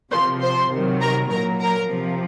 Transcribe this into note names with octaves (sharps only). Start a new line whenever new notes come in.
C3 F3 C5 C6
C5 C6
C3 D#3 F#3
A#4 A#5
A#2 F#3 A#4 A#5
A#4 A#5
C3 F3